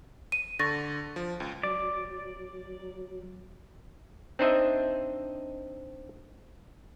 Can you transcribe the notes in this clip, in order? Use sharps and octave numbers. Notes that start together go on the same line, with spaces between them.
D#7
D3 C#6 A6 A#6
F3
C#2
F#3 D5
C4 D4 D#4 C5 D#5 E5